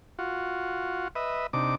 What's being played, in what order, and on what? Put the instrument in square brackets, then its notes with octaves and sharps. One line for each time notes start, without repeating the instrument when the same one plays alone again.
[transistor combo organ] F4 F#4
B4 D#5 E5
C3 D4 D#4 D6